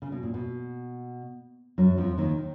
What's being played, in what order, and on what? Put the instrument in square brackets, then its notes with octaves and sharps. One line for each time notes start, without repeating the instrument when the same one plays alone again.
[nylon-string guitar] C#3
B2
A#2
B2
F#2 F#3
F2 F3
D#2 D#3
D#3